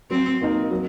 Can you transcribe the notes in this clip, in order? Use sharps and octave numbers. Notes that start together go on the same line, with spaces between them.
F#3 C4
A#3 D#4 A#4
F#3